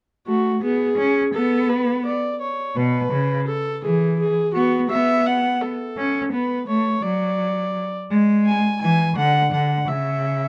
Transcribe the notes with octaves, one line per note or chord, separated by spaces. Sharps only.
A3 F#4
B3 G#4
C#4
B3 A4
B4
D5
C#5
B2 B4
C#3
A4
E3 G#4
G#4
B3 F#4
B3 E5
F#5
A4
C#4
B3 B4
A3 C#5
F#3 D5
G#3
G#5
E3 G#5
D3 F#5
D3 F#5
C#3 E5